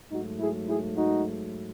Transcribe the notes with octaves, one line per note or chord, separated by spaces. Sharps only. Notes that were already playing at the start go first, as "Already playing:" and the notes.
G#2 F#3 A3 D#4 F#4
E4 G#4
E4 G#4
D#4 F#4